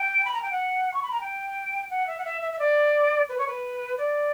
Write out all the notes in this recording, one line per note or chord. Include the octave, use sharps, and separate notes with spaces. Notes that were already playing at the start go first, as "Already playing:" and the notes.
Already playing: G5
B5
A#5
G5
F#5
C#6
B5
A#5
G5
F#5
E5
F#5
E5
E5
E5
D5
B4
C#5
B4
D5